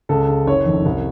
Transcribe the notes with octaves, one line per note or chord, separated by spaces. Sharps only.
C#2 A4
C#3
F#1 C#5
F2 D#3
C2